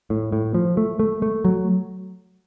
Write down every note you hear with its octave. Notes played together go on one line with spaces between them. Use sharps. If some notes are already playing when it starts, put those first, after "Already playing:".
A2
A2
F3
A3
A3
A3
F#3